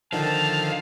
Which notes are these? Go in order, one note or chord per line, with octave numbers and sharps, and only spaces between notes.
D3 D#3 F3 F5 A5